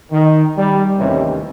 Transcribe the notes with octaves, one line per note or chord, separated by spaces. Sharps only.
D#3
G3
A1 D#2 C3 E3 C#4